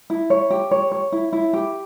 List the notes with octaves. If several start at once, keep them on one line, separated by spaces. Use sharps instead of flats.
E4
C#5
G4
C#5
C#5
E4
E4
G4